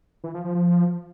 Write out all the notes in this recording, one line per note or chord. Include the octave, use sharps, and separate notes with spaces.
E3
F3
F3
F3